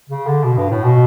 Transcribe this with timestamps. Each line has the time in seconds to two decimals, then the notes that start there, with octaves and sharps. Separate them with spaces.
0.10 C#3
0.27 D3
0.44 B2
0.57 G2
0.70 A2
0.84 B2